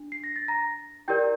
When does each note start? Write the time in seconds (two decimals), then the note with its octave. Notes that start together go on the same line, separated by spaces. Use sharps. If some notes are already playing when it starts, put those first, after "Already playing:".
Already playing: D4
0.12 C7
0.24 A#6
0.36 A6
0.48 A#5 A#6
1.08 E4 G4 A#4 D5 G5 G6